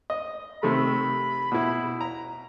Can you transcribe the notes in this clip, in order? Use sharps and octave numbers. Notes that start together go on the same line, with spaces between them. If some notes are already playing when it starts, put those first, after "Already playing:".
D#5
C3 D#3 A3 B5
B2 E4
A#5